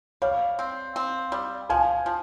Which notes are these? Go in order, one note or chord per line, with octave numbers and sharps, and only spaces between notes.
G3 C#5 F5
C4
C4
G3
F3 F5 G#5
F3